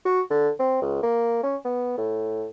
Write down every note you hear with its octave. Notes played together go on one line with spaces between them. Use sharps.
F#4
D3
C4
C#2
A#3
C#4
B3
A2